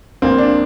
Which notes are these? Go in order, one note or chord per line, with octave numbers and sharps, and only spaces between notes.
A#1 A#2 A#3 C4
D4